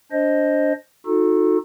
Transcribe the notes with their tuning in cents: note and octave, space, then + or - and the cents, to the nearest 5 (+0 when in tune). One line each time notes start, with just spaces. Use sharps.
D4 -20 C5 +10 D#5 +0
D#4 +0 F#4 -35 A4 +0